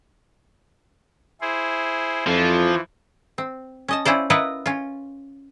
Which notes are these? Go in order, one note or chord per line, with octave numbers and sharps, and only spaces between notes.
E4 G#4 C5
F2 E3 F3
C4
C#4 D#5 A5
C#4 E4 F4 C5 D5
E4 F4 A#4 B4 D#5 F#5
C#4 F4